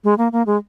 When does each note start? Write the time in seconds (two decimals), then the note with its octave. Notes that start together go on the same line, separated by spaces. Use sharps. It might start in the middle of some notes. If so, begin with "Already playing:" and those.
0.04 G#3
0.18 A#3
0.32 A#3
0.46 G#3